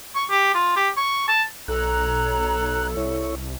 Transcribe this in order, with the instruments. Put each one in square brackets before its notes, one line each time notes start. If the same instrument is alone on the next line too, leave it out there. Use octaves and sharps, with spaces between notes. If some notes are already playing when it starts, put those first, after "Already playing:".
[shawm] C#6
G4
F4
G4
C#6
A5
[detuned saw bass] B1 [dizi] A4 [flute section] C#5 A#5 [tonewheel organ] F#6
[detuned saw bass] C2 [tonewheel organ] E4 C#5